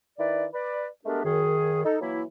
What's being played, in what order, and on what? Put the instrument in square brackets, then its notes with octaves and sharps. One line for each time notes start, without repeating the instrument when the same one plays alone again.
[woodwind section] D#3 E4 B4 D5
B4 D5
G#3 A3 B3 D4 G4 A#4
F#2 D#3 G#4
D#4 A4
E3 F#3 A#3 E4